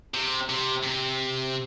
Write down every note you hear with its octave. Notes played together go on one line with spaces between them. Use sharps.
C3
C3
C3